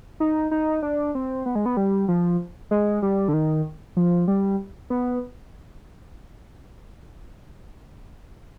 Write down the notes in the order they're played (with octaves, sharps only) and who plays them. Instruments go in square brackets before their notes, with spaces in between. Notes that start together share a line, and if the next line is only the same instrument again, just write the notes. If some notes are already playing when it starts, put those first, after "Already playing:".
[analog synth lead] D#4
D#4
D4
C4
B3
G#3
B3
G3
F3
G#3
G3
D3
D#3
F3
G3
B3